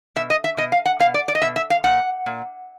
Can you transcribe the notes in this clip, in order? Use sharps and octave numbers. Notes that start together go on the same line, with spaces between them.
B2 E5
D#5
E5
B2 D#5
F5
F#5
B2 F5
D5
D5
D#5
B2 E5
E5
F5
A#2 F#5
A#2